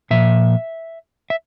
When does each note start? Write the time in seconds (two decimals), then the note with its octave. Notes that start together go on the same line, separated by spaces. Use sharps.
0.11 A#2 F3 E5
1.30 E5